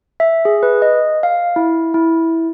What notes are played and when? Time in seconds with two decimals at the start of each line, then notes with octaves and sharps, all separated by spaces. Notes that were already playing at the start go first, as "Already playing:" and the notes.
0.20 E5
0.45 G#4
0.63 B4
0.82 D#5
1.23 F5
1.56 E4
1.94 E4